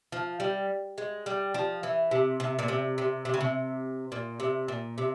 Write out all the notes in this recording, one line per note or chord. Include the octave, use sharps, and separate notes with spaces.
F3
G3
G#3
G3
F3
E3
C3
C3
A#2
C3
C3
C3
C#3
C3
A#2
C3
A#2
C3